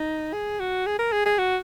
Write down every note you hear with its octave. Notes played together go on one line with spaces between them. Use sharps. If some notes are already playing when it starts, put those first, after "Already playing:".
Already playing: D#4
G#4
F#4
G#4
A#4
G#4
G#4
F#4